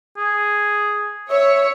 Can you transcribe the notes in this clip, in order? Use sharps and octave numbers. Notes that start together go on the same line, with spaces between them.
G#4
C#5 E5